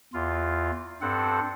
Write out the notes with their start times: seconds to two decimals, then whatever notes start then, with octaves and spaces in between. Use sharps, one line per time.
0.13 E2 F4
1.02 G2 C4 A4 F#5